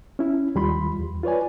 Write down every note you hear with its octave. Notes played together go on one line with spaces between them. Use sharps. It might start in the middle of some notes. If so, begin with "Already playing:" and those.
C#4 E4
D#2 G3 F4 B5 C6
E2
F4 B4 C#5 D5 G#5